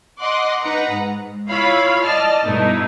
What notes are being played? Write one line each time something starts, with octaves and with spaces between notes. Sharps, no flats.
D#5 F#5 C6 D6 F#6
D#4 B4 F#5 A#5
G#2
E4 F4 C#5 F5 B5
D5 D#5 A5 F6
G2 B2 A3 B3 D#4 E4